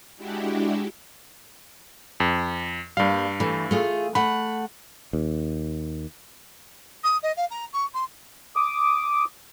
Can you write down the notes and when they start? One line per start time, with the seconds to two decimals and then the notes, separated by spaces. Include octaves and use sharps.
0.17 G#3 D4 E4 F#4 G4
2.20 F2
2.97 G2 G3 A#3 F5
3.40 E3 A3
3.71 A3 F4 G#4
4.15 A3 F#5 B5
5.13 D#2
7.03 D#6
7.23 D#5
7.36 F5
7.50 A#5
7.73 C#6
7.93 C6
8.56 D6 D#6